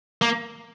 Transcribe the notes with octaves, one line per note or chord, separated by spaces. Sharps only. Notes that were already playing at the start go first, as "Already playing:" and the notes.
A#3